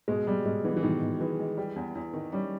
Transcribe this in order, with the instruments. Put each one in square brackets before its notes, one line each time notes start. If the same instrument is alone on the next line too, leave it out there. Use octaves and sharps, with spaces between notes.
[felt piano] B2 [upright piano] G#3
[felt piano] B2 [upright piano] G3
[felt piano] B2 [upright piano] G#3
[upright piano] E3 [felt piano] B3
[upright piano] E3
[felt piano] B2 [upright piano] D#3
[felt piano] B2
[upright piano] E3 [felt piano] G#3
[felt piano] G#3
G3
E2
E2
D#3
[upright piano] G3 [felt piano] C#4